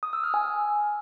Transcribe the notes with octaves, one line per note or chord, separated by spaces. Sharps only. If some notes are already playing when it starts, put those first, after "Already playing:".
D#6
E6
F6
G#5